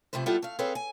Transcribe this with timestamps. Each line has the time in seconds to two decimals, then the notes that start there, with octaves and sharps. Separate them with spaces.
0.13 F2 C3 A3 B4 C5
0.26 G3 B3 E4 F4 G4 A4
0.43 A3 F5
0.59 C4 G#4 A4 B4 C#5 F5
0.75 G#5